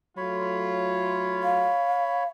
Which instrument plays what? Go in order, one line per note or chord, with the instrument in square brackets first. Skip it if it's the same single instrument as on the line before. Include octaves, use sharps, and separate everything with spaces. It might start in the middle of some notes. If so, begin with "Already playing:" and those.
[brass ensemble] F#3 A3 F4 [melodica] C#5 B5
[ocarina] F5